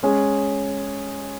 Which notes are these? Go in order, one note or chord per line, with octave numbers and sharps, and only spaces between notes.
G#3 C#4 G#4